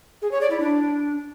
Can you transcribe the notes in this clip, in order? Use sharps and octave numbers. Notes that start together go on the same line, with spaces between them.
G#4
C#5
D5
E4
D4